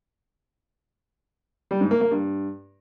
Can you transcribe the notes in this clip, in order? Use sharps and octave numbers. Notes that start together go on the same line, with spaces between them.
G3
G#2
A#3
A#3
G2